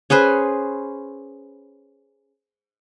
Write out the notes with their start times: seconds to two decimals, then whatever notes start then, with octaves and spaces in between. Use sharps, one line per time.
0.10 C#4 G#4 B4 C5